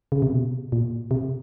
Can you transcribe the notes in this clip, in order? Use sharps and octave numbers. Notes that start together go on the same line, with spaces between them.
C#3
C3
B2
A#2
C3